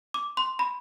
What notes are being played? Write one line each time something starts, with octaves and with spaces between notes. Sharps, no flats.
D6
C6
B5